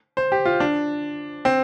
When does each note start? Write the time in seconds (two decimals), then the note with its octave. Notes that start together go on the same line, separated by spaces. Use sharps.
0.17 C5
0.32 G4
0.45 F4
0.60 D4
1.45 C4